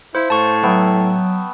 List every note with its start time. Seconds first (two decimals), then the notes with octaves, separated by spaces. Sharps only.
0.15 E4 C5 F5
0.30 A2 A5 C#6
0.63 F#3 B3 E5 G5